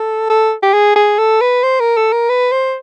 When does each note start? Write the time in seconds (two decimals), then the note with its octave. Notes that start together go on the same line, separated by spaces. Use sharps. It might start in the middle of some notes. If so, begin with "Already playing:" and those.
Already playing: A4
0.30 A4
0.63 G4
0.73 G#4
0.96 G#4
1.18 A4
1.41 B4
1.63 C5
1.80 A#4
1.97 A4
2.12 A#4
2.30 B4
2.52 C5